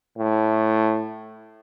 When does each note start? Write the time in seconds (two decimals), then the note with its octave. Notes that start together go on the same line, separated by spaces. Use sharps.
0.18 A2